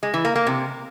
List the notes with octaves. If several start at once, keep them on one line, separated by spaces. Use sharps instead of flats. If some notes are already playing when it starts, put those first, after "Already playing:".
G#3
E3
A#3
A#3
C3